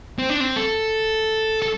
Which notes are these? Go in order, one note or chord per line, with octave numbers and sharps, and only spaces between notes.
C4
D4
C4
A4
A4